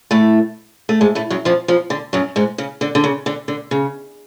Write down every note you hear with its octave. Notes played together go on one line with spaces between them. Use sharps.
A2 A3
A3
G#2 G#3
A2 A3
F#2 F#3
F2 F3
F2 F3
D3
F#2 F#3
G#2 G#3
C#3
D3
D3
C#3
D3
D3
C#3